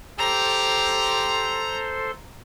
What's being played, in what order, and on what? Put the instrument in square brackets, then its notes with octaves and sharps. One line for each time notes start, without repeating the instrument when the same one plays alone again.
[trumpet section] G4 [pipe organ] A4 C5 C6 [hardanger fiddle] A#5